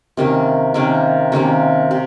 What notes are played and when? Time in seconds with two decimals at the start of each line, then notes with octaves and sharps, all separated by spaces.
0.17 C3 D#3 A#3 C#4
0.74 C3 D#3 A#3 C#4
1.32 C3 D#3 A#3 C#4
1.91 C3